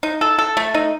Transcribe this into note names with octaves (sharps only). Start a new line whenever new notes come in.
D#4
A4
A4
A3
D#4